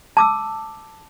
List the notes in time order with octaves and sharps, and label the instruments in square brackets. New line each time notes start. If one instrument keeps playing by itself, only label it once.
[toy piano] A5 D6 E6